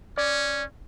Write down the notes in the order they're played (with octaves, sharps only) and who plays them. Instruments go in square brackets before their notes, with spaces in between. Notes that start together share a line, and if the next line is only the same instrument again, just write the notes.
[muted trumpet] C#4 [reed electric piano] D5